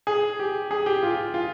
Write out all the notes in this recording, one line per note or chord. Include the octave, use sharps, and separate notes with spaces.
G#4
G4
G#4
G4
F4
F4